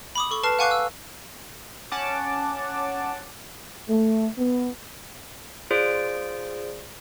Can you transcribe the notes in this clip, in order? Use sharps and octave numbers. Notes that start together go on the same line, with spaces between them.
B5 D6 D#6
A4 C#6
B4 A5 F6 C7
F5 F#5 G#5 C#6 D6 F#6
E6
C#4 F#5 A5 D6
A3
B3
F4 G#4 C5 D5 D7